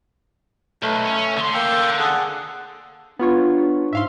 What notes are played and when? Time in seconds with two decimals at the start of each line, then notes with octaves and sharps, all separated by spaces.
0.82 B1 A3
1.05 C#4
1.37 D3 C6
1.54 A#3 G5 E6
1.99 G#4 A4 F#5
3.19 B3 D4 F4 C#5
3.93 G#2 E5 F5 C6